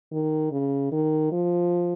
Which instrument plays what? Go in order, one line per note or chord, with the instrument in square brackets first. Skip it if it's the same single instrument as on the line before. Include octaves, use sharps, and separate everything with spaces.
[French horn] D#3
C#3
D#3
F3